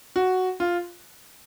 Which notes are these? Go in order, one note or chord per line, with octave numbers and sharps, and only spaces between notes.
F#4
F4